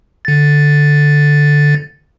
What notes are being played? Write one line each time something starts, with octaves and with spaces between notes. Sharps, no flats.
D3 A6